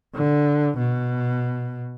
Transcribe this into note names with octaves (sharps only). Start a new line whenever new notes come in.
D3
B2